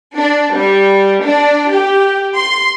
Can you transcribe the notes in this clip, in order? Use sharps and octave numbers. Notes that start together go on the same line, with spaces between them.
D4
G3
D4
G4
C6